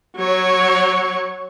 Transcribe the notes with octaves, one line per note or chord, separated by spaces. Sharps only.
F#3 C#5